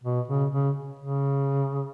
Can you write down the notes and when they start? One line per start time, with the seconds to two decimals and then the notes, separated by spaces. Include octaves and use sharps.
0.04 B2
0.28 C#3
0.52 C#3
0.99 C#3